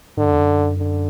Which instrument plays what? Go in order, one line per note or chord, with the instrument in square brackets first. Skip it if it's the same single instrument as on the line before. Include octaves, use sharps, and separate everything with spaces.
[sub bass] G#2 [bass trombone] D3
[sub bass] F#2
E2
F#2
[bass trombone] D3